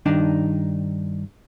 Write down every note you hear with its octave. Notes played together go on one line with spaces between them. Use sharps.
G2 D#3 D4 D#4